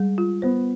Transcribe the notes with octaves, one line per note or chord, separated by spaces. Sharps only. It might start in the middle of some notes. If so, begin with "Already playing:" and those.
Already playing: G3 G#3
F4
B3 C5